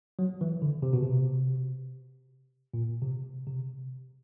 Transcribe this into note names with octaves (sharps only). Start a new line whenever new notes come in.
F#3
E3
D3
C3
B2
C3
A#2
C3
C3